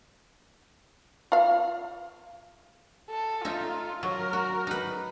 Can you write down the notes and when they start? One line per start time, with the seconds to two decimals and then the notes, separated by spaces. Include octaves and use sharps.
1.32 F4 F5
3.11 A4
3.45 D#4 F4 E5
4.03 F#3 A#4
4.33 F#4
4.67 D#4 B4